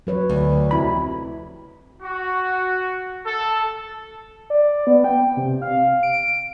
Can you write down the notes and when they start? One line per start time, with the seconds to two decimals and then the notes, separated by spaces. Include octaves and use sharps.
0.07 F#3 B4 C#5
0.30 D2 A3
0.71 F2 C3 F#3 E4 B5
2.02 F#4
3.26 A4
4.50 D5
4.87 B3
5.04 G5
5.37 C3
5.62 F5
6.03 D7